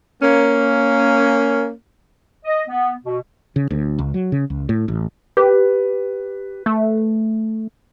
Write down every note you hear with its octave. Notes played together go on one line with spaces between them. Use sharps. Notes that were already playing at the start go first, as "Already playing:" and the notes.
A#3 C#4
D#5
B3
B2
C#3
D2
C#2
F#3
C#3
C#2
A2
A1
G4 B4
A3